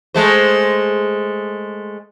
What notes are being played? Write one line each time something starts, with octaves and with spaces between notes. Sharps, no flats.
G#3 A3 C5